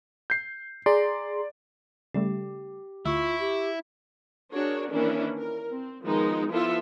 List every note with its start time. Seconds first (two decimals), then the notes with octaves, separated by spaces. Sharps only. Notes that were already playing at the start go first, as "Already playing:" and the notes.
0.30 G6 C7
0.86 G#4 D5 A#5 C6
2.14 C#3 G3 A3 G4
3.06 D2 E4 F4 C#6 E6
3.40 G4
4.52 D4 F#4 G#4 A#4 C#5
4.91 D#3 E3 A#3 C#4 D4 E4
5.38 A#4
5.71 C4
6.04 D#3 F3 G#3 B3 D#4
6.50 F3 B3 E4 F4 A4 E5